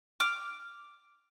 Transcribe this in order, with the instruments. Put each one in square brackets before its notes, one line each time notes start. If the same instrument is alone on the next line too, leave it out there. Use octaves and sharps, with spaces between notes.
[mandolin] D6 F6